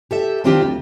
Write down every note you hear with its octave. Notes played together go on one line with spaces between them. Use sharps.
G4 A4 E5
D#3 F#3 C4 D4 F4 G4
D2